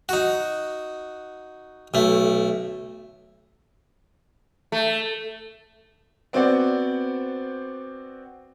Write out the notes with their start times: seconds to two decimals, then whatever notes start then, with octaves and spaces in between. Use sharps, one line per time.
0.09 D#4 F#4
1.94 B1 A3
4.72 A3
6.33 B3 C4 F#4 C5 D5 F#5